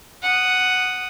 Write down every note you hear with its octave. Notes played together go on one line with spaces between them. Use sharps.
F#5 D#6